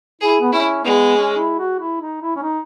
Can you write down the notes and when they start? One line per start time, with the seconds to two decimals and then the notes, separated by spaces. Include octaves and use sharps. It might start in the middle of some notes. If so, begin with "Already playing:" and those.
0.21 E4 G#4
0.41 B3
0.52 C#4 E4
0.85 G#3 B3
1.16 C#4
1.37 E4
1.59 F#4
1.80 E4
2.01 D#4
2.22 E4
2.36 C#4
2.43 D#4